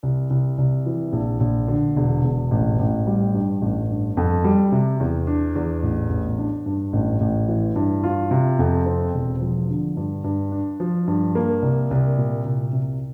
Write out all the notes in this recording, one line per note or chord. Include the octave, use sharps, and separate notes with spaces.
C2
C2
C2
E3
A#1
A#1
D3
E1
E1
A1
A1
G3
G2
A1
G2
F2
G3
C3
E2
D4
E2
A1
A1
D4
G2
A1
A1
E3
G2
F4
C3
F2
C4
E1
F3
D3
G2
G2
D4
F3
G2
A#3
C2
C2
A#2
C2
C3